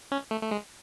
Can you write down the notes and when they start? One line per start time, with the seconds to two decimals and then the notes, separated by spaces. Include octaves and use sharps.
0.12 C#4
0.31 A3
0.42 A3
0.51 G#3